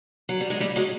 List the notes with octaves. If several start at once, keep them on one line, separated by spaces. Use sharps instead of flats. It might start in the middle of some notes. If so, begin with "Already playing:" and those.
F#3
G3
G#3
G3 A3
F#3 G#3